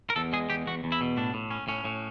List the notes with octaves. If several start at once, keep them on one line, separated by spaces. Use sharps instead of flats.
A#4
E2 A4
G#3 G#4
E2 G4
E2 F#4
E2
E4
B2
A2 D4
A2
C#4
A2 C#4
A2